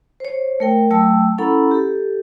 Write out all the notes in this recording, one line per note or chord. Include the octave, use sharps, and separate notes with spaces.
C5 C#5
A3 A#4 G5
F#3 A3 G5 A5 E6
C#4 E4 A4 F#5 A#5 B5
G4 A4